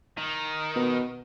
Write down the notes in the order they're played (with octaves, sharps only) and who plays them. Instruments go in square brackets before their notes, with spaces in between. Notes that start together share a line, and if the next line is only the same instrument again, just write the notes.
[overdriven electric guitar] D#3
[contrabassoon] B2